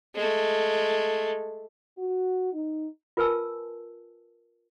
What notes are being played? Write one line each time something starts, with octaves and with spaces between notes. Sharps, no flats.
G#3 A3
F#4
D#4
F4 A#4 B4 G#5 A5 E6